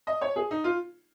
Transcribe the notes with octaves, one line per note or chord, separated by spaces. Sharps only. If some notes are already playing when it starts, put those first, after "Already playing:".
D#5
C#5
G#4
D#4
F4